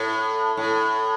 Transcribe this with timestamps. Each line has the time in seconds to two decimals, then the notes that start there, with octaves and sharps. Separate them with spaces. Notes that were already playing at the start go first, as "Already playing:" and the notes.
Already playing: A2
0.57 A2